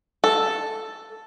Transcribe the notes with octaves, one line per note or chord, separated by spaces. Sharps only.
A4